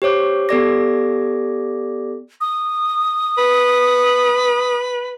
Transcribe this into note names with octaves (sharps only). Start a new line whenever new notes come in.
G4 C5 C#5 D6
B3 G4 A4 D5 D6 A#6
D#6
B4